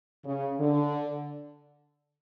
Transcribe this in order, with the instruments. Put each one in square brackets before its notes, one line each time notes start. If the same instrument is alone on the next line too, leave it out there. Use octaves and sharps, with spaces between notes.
[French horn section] C#3
D3